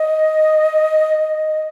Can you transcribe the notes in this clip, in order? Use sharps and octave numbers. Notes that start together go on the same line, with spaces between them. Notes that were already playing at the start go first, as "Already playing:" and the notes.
Already playing: D#5